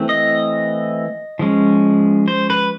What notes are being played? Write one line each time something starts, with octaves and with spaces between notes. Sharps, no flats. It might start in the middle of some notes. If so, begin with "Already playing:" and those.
Already playing: E3 A3 C4
D#5
F3 G#3 C#4
C5
B4